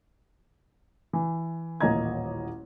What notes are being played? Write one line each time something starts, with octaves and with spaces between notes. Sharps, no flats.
E3
D#1 A1 A#3 D#5 A#5 G#6